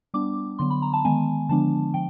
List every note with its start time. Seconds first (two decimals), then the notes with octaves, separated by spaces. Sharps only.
0.14 G3 B3 D4 D6
0.59 D3 F#3 B3 C6
0.70 B5
0.82 A#5
0.93 A5
1.05 D#3 G#3 B3 G#5
1.49 D3 F3 G#3 B3 D4 A5
1.94 F3 G5